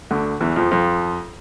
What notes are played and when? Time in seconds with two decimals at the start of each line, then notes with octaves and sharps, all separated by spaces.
0.11 D2 D3
0.41 E2 E3
0.56 F2 F3
0.71 F2 F3